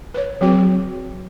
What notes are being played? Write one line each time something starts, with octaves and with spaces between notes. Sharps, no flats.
B4 C#5
F#3 C4 F#4 G#4